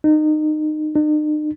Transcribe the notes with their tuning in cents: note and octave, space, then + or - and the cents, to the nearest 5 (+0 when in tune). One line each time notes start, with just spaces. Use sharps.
D#4 -25
D#4 -45